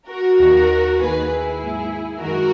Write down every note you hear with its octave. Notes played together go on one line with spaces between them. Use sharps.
F#4 A#4
D#2 D#3 A#3
D#2 D#3 A#3 G#4 B4
E4 G#4
G#2 F#3 A#3
F#2 D#3 G#3 F#4 A#4